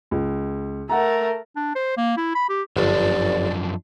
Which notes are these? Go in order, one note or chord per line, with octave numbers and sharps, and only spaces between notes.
C#2
A3 A#4 F#5 A#5
D4
C5
A#3
E4
B5
G4
G1 F#2 F3 D4 D5